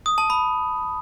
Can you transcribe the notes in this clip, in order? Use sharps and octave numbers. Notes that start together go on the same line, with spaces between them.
D#6
A5
B5